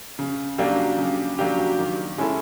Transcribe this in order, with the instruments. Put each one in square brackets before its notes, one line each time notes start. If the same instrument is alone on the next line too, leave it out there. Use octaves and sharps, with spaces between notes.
[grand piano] C#3
F#3 A#3 D4 G4
C#3
F#3 A#3 D4 G4
D#3
G#3 C#4 E4 A4